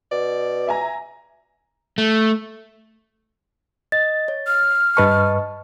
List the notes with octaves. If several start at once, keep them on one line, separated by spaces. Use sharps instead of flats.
B2 D5
E5 G#5 A#5
A3
D#5 A6
C#5
F6
G2 B4 D#5 A5 C#6